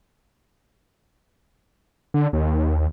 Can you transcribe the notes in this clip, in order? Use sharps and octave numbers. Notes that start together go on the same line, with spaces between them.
D3
D#2